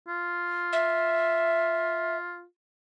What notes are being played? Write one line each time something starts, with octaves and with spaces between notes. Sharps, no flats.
F4
E5